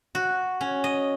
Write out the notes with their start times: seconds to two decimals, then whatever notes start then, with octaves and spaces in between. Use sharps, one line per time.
0.15 F#4
0.61 C#4
0.84 D#5